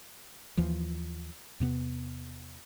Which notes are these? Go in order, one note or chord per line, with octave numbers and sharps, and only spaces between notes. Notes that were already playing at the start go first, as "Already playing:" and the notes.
D#2 E3 F3
E2 C3 B3